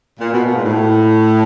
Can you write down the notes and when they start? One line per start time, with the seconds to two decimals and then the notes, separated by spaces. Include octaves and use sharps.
0.20 A#2
0.32 B2
0.44 A#2
0.55 G#2
0.65 A2